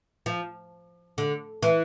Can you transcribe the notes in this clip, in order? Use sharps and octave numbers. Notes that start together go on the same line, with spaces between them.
F3
D3
E3